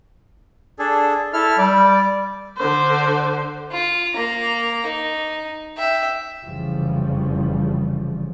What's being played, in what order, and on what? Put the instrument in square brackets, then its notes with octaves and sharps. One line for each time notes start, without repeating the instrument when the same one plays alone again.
[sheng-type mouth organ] D4 G#4 A4
E4 A4 F6
[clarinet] G3 [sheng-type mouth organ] D5
[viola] D3 C5
[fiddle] F4
A#3 A#5
D#4
E5 G5
[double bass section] F1 C#3 E3 F3 G3